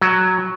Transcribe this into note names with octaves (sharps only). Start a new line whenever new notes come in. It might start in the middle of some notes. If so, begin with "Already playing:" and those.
F#3